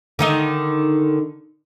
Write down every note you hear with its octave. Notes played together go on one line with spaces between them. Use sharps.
D3 D#3 D#4